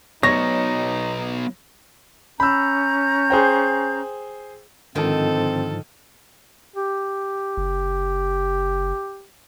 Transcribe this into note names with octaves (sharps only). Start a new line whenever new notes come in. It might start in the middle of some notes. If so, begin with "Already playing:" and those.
F#3 B3 D#4 C#5 A#6
C#4 A#5 B5 E6 G6
G#4 C5 G5
G#2 D3 D#3 F3 C4 A4
G4
F#1